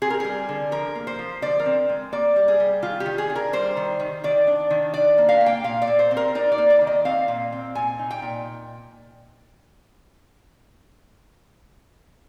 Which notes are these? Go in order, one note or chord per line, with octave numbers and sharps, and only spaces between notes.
C4 G#4
A#4
G3 G#4
D3
F3 A#4
A#3
C5
F3
D3 D5
A#4
C4
G#3
A#3 D5
G3
G#4
G3
D#3 F4
G4
D#3
G#4
D4
A#4
G3 C5
D#3
D#3
D#3 D5
D4
D#3
D4 D5
A#3
F5
A#3
G5
A#2 F5
D5
A#2
C5
C4
A#4
D#4 D5
D5
A#3
D5
D#3
D#5
C4 F5
A#2
C4
A#2 G#5
D#4
G5
A#2